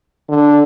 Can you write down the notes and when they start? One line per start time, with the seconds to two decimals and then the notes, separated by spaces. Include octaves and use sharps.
0.29 D3